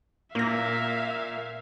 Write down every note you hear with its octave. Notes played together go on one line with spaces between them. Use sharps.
A#2 A#3 E5 F5 A#6